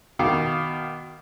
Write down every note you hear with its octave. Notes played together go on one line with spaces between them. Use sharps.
B2 D#3 F5 D6